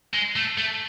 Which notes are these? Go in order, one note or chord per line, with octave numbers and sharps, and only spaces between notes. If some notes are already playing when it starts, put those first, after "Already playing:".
G#3
A3
A3